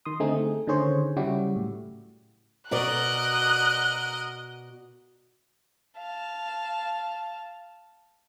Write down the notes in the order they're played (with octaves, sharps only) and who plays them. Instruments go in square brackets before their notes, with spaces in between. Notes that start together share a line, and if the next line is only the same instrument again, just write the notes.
[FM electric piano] D#3 C6 D#6
D3 A3 C4 D#4 G#4
A3
D3 D#3 C#4 G#4 C5 C#5
C#3 F#3 G3 E4 F#4 G4
A2
[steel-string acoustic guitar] B2 F#4 D5 [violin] A#4 D#5 [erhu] F#6
[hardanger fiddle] F5 A5